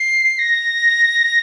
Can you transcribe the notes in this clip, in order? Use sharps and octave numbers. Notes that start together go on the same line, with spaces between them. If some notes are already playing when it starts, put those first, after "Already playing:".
Already playing: C7
A#6